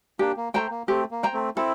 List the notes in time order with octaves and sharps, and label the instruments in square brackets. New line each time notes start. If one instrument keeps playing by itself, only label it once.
[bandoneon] A#3 D4 [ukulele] G4
[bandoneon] A#3
[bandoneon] A3 [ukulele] C5 G5 A#5
[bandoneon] A#3
[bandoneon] A3 C4 [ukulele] G4
[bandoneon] A#3
[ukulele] C5 G5 A#5
[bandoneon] A3 C4
[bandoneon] C4 E4 [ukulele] A4